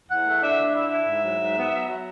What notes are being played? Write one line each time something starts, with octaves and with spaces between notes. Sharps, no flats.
E2 F#5
A3
D4 E5
D3
E4 E5
E4
G#2
F#3
G#2
B3
F#3
F#3